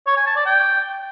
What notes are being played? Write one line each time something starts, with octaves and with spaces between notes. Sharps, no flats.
C#5
G#5
A5
D5
G5